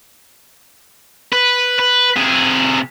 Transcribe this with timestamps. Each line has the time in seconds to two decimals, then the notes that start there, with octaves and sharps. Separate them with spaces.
1.32 B4
1.79 B4
2.17 C3 G#4